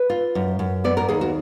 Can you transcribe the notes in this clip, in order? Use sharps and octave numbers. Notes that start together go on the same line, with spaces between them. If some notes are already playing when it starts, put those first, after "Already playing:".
Already playing: B4
F4
F#2
F#2
B3 D5
A#4
D#2 G#4
F#4